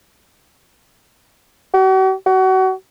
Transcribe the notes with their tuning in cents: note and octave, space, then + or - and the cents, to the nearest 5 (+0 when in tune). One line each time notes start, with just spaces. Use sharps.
F#4 +45
F#4 +30